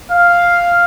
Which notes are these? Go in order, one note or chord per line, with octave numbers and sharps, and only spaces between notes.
F5